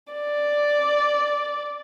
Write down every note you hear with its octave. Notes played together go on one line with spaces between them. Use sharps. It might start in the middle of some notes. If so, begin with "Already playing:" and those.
D5